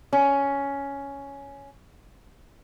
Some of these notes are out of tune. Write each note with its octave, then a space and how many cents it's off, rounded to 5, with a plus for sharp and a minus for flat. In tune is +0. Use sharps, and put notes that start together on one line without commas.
C#4 +10